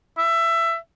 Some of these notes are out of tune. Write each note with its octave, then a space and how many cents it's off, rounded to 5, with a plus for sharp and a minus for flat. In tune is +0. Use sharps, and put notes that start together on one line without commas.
E5 +15